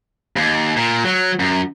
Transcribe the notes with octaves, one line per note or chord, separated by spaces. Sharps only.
D#2
A#2
F#3
F#2